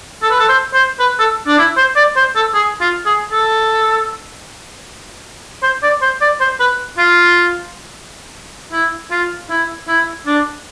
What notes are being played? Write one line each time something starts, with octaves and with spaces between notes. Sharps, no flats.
A4
B4
A4
C5
C5
B4
A4
D4
E4
C5
D5
C5
A4
G#4
F4
G#4
A4
C5
D5
C5
D5
C5
B4
F4
E4
F4
E4
E4
D4